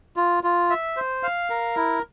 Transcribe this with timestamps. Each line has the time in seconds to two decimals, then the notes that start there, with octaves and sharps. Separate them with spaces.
0.16 F4
0.43 F4
0.70 E5
0.97 C5
1.23 F5
1.50 A#4
1.76 E4